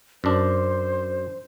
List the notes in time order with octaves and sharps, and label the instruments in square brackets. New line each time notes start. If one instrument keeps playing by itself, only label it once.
[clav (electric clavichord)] F#2 D4 [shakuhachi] C5